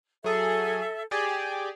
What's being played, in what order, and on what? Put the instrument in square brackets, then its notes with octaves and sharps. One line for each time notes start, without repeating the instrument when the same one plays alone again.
[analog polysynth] F#3 G#4 [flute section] A4 E5
[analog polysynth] G4 G#4 D5 [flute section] G#5